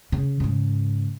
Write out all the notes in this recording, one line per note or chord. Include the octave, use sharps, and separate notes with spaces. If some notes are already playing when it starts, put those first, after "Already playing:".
C#3
G#2 C#3